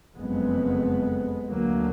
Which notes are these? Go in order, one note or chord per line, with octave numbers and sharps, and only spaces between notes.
F#1 F2 G#3 B3
D2 F#3 A#3